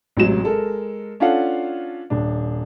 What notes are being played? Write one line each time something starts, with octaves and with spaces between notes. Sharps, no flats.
A1 G#2 C3 F#3 E7
G#3 A4 A#4
C#4 D4 F4 A4 F5 F#5
D#1 D4